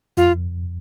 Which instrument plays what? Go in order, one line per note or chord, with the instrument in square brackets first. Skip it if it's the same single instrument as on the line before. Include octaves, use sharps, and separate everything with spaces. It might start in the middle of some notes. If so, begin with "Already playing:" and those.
[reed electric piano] F2 [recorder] F4